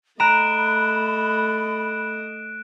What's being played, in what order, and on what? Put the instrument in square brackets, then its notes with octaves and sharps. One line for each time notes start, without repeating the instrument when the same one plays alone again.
[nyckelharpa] A3 D#5 [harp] A#5 [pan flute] B5 [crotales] F#6 D7 E7